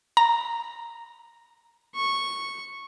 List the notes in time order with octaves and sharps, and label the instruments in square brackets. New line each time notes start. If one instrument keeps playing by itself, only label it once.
[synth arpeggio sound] A#5
[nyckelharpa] C#6